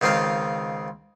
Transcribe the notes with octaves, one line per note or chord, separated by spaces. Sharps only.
C#2 D#3 C4 F4 F5